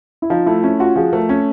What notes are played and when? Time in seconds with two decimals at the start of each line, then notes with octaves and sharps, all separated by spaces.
0.22 E4
0.30 F3 D#4
0.46 A3 E4
0.63 C#4 E4
0.79 F4 F#4
0.96 F3 G#4
1.13 A3 A#4
1.29 C#4